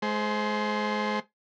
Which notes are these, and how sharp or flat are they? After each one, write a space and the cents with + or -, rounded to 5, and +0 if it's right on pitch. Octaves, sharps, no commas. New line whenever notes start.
G#3 +30 C5 +0